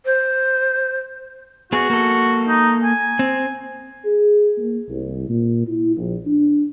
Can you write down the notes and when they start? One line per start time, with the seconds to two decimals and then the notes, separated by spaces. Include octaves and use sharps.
0.05 C5
1.73 B3 F#4 G#4
1.90 A#3 A4
2.48 D#4
2.84 G#5
3.19 C4
4.05 G#4
4.58 A#3
4.88 C2
5.29 A#2
5.66 E4
5.96 A#1
6.26 D4